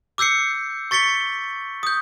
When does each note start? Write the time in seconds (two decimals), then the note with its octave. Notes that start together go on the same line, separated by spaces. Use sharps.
0.18 D6 E6 G6 C7 C#7
0.91 C#6 A6 B6 C#7 G7
1.83 D#6 G6